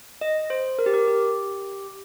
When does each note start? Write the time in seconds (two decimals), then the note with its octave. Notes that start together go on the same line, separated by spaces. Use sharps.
0.21 D#5
0.50 C5
0.79 A#4
0.86 G4
0.94 A#4
1.08 G4